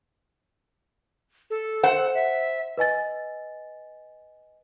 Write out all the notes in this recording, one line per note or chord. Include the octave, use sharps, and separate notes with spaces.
A4
C5 F#5
E5
B4 D#5 G#5 A6